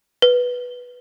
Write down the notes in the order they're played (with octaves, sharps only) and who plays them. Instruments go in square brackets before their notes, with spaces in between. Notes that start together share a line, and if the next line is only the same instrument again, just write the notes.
[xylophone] B4